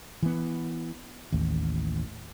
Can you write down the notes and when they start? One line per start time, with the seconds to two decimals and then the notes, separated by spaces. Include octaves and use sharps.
0.23 E3 B3
1.33 A1 D#2